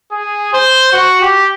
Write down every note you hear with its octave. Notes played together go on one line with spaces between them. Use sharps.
G#4
C5
F#4
G4